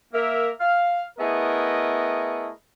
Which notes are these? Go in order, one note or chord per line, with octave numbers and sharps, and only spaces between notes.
A#3 A#4 E5
F5
A3 B3 E4 G#4 A#4 D#5